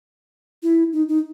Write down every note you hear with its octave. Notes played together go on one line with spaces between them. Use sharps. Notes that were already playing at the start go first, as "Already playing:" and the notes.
E4
D#4
D#4